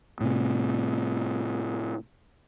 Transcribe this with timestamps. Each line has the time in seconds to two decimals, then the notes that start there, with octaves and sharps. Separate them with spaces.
0.21 A2 C3